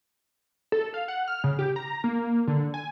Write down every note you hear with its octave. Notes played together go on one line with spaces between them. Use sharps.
A4
F5
F#5
F6
C#3
G4
A#5
A#3
D3
G#5